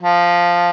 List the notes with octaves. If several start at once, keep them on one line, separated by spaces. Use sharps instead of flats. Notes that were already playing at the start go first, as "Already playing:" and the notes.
F3